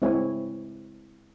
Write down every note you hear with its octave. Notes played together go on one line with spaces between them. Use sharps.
G#3 C4 E4 C#5 G#5